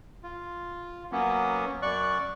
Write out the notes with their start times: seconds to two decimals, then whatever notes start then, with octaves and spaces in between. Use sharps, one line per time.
0.23 F4
1.12 F#3 A#3 B3 C#4
1.82 F#2 D5 C#6 F#6